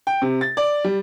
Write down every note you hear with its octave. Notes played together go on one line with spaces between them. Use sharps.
G5
C3
A6
D5
G3